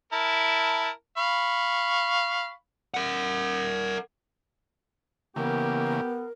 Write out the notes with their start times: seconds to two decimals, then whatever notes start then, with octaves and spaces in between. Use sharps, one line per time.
0.13 E4 A#4 A5
1.18 F5 B5 C#6
2.94 A#4 F#5
5.36 C#3 E3 A#3 B3 G4 A#4